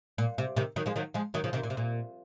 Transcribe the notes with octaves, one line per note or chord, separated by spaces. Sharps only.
A#2
C3
C3 D#3
D#3 F#3
F3 G#3
D#3 F#3
F3 G#3
D#3 F#3
C#3 F3
C3 D#3
A#2
C3
A#2